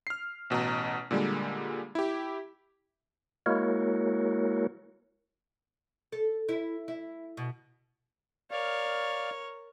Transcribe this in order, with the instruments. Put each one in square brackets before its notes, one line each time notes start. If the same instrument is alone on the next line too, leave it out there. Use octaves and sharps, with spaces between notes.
[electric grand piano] F6 C7
A1 B2 D#5 A#5
A#2 D3 G3 G#3 A#3
E4 G4
[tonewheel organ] G#3 A#3 E4 F#4 A#4 C#5
[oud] A4
E4
E4
B2
[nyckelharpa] A#4 C#5 [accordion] D5 F5